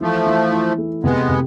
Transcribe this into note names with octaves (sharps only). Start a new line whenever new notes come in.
E3 F3 A3
E3
E4
A3
C3 G#3 B3
C3